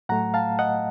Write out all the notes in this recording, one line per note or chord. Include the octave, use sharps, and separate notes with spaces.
A2 F#3 A3 F#5 A#5
F5 A5
D#5 F#5